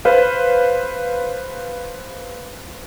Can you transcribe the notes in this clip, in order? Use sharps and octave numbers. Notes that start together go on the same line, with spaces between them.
B4 C5 F5